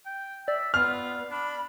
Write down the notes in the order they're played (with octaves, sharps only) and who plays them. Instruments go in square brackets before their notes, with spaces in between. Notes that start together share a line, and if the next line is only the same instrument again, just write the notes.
[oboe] G5
[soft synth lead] D5 [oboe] E5
[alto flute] B3 [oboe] F4 [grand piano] F6
[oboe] D4 [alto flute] B5